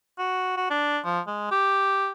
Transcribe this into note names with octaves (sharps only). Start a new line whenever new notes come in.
F#4
F#4
D4
F3
G#3
G4